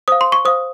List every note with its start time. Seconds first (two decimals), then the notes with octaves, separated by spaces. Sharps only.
0.08 C5 F5 D#6
0.21 C6
0.32 C#6
0.45 C5 F5 D#6